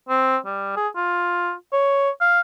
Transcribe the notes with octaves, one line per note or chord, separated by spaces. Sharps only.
C4
G3
G#4
F4
C#5
F5